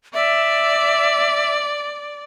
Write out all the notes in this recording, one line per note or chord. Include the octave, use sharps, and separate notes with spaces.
D5 E5